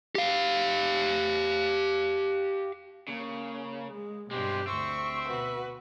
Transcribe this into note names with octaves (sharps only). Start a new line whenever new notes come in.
G4 F5
C#3 A#3
G#3
G2 B2 G#3 C4 G4
D2 C4 E5 C#6
B2 F#4 B4